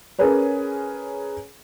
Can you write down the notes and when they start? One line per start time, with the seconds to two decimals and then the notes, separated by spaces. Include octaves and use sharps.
0.19 C#4 G#4 A#4 B4 C#5